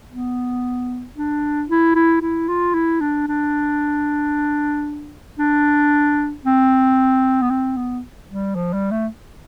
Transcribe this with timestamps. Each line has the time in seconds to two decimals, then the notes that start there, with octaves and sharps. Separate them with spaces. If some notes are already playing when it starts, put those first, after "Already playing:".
0.11 B3
1.16 D4
1.69 E4
1.95 E4
2.22 E4
2.48 F4
2.74 E4
3.01 D4
3.28 D4
5.39 D4
6.45 C4
7.42 B3
7.50 C4
7.77 B3
8.29 G3
8.55 F3
8.73 G3
8.91 A3